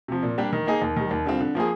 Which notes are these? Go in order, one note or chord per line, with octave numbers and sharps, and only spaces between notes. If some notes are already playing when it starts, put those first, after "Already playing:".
C3 F3
A#2
G3 A#3 D4 G4
D#3
A#3 D#4 G#4
D#2
D#3 G3
D#2
D3 G3 C4 F4
D3
F3 A#3 F4 G#4